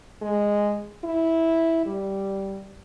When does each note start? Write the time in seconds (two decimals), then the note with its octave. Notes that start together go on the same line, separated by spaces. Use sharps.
0.22 G#3
1.04 E4
1.86 G3